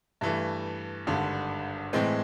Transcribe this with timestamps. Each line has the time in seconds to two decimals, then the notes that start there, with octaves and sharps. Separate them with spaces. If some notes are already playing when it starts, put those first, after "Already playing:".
0.21 G2 E3 A3
1.07 G#1 G2 D3
1.93 A2 E3 G#3 C4